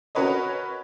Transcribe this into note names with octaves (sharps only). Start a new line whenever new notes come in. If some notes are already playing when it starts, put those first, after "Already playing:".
C#4 F#4 A#4 B4 C#5 D#5